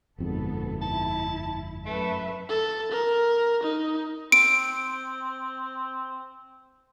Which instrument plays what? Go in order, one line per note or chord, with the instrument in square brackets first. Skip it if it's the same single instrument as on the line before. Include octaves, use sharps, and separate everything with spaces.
[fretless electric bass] G1 F2 G#2 [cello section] B2 B3 A4
[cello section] E4 [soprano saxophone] A5
[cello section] F#2 B4 E5 [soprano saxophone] A3
[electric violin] A4
A#4
D#4
[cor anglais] C4 [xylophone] D7